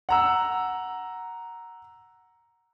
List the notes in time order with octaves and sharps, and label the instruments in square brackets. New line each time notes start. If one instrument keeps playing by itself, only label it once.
[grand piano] F#5 A#5 E6